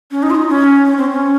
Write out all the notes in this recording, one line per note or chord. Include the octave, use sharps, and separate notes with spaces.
C#4
D#4
F4
D#4
C#4
C#4
C4
C#4